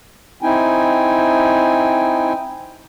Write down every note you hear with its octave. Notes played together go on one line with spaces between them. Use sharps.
C4 D#4 E4 G5 G#5